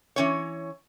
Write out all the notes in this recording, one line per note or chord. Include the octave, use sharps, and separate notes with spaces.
E3 C#4 C#5